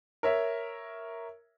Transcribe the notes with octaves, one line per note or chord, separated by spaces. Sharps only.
A#4 C#5 E5